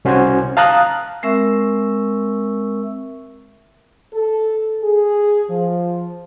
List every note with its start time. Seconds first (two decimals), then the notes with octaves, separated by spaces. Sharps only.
0.05 C2 C#4 F#4 C5 G#5
0.57 F5 A5 A#5 D#6 F#6
1.23 G#3 C4 A#4 E5 C#6 E6
4.13 A4
4.83 G#4
5.48 F3